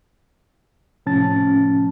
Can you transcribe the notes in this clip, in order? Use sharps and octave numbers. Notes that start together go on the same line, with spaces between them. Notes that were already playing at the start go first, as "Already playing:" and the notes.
A2 C3 F3 C#4 A5 A6